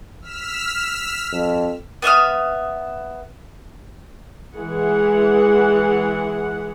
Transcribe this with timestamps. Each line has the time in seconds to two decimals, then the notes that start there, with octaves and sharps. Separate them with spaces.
0.21 E6 F6 B6
1.32 F2
2.02 B3 E5 D#6 F6
4.55 E3 G#3 E4 G#4 F#5